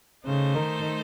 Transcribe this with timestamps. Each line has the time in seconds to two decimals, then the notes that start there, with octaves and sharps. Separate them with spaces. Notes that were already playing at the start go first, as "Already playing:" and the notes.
0.25 C#3 A3 D#4 A4 C5
0.55 D#3